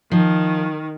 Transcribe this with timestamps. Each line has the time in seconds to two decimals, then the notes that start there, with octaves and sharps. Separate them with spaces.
0.11 D#3 F3